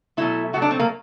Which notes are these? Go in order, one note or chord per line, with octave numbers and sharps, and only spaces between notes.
B2 F#3 A3 E4
B2 F#3 A3 F#4
D4
C4
A#3